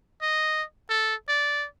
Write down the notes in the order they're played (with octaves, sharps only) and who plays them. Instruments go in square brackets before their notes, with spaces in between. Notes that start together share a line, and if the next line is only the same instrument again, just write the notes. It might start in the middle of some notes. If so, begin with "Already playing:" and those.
[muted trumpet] D#5
A4
D5